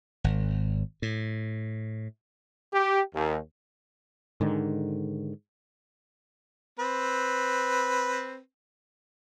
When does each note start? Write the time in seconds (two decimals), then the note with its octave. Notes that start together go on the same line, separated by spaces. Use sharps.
0.24 G#1
1.02 A2
2.73 G4
3.14 D#2
4.41 G#2 D3 D#3
6.79 C4 B4